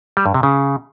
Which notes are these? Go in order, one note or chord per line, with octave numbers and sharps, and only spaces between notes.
G3
G2
C3
C#3